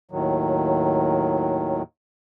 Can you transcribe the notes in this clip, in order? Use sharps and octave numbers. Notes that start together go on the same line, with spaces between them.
D#2 A2 D#3 F#3